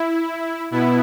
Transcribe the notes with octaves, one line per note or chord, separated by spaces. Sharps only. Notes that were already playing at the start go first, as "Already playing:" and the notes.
Already playing: E4
B2 B3 E4